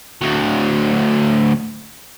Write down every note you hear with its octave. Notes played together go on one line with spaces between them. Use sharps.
D2 F#3